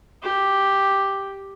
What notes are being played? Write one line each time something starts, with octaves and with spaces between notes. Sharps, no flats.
G4